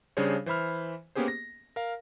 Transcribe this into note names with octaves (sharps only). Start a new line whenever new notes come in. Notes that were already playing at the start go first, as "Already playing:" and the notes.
C#3 G3 D4 G#4 C5 C#5
E3 C5 E5 B5 F6
A#3 B3 C#4 G4 G#4 C5
A#6
A#4 F5